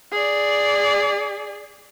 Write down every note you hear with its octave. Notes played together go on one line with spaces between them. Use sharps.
G#4 D5